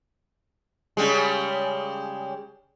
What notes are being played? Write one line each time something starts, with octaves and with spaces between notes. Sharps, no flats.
C#3 G3 G#3